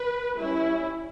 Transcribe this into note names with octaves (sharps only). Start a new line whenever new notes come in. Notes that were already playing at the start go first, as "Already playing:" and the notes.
Already playing: B4
G3 C#4 E4